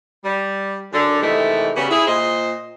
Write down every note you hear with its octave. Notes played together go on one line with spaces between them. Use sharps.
G3
F#2 D3
C3 D#3 E3 G#3 A3
C#3 F#3 G3 B3 C#4
E4 G#4
A#2 C5 D#5